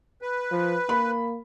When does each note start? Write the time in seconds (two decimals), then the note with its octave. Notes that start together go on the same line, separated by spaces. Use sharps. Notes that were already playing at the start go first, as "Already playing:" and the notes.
0.22 B4
0.52 F3
0.89 A#3 B5